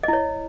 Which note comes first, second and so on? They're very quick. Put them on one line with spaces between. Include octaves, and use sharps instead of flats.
D#5 E4 C#5